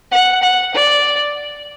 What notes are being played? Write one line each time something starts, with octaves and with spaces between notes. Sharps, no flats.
F#5
F#5
D5